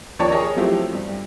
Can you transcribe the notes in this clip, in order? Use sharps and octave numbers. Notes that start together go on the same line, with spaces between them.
D#2 F3 C#5 D5 A5 C#6
G#4 A#4 C#5 D#5
F3 F#3 A3 C4 E4 G4
G2